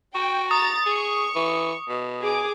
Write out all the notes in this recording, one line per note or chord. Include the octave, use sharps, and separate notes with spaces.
F#4 G5
A#5 D#6 A6
G#4 C#6
E3
B2
G#4 D6